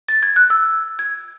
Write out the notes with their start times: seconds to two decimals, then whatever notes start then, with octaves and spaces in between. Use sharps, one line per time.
0.09 A6
0.23 G#6
0.36 F#6
0.50 E6
0.99 G#6